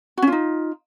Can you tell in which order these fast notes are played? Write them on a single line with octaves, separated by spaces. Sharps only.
F#4 C#4 F4 D#4